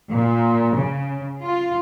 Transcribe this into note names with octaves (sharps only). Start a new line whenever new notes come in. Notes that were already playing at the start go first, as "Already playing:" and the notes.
A#2
C#3
F4